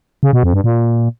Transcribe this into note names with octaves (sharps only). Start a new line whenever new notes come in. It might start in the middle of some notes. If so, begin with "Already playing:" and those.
C#3
B2
F2
G2
A#2